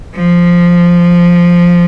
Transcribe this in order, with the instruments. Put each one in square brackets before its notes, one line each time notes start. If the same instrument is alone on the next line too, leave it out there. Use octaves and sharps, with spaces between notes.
[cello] F3